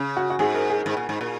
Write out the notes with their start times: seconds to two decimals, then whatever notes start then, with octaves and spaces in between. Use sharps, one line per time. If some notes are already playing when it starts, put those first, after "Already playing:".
Already playing: C#3
0.17 F#4
0.30 F#4
0.39 G#2 G#4
0.54 A#4
0.70 G#4
0.86 G#2
0.97 A#2
1.09 G#2
1.21 A#2